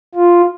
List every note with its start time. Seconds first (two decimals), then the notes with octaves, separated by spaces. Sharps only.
0.15 F4